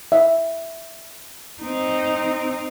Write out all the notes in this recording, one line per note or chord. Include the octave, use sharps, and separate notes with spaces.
E5
C4 D#4